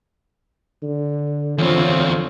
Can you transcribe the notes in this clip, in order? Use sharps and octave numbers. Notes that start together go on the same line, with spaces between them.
D3
E2 D3 F3 C4 F4 C#5